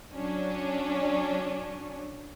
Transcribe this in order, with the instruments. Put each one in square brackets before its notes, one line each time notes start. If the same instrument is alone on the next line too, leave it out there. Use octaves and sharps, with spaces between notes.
[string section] F#3 C#4 D4